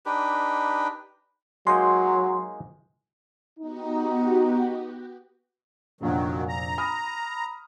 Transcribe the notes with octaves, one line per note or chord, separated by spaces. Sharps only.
D4 D#4 G4 B4
F#3 G#3 A#3 D#4 C6
B3 D#4 F#4 G4
F1 A#1 D#3 F#3
A#5
B5 D#6 F6